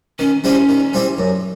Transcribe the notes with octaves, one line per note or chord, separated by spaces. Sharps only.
D#3 C#4
G3 C4 C#4 E4 G4
D#3
G3 C4 E4 G4
F#2